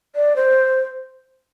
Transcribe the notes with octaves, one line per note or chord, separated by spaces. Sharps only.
D5
C5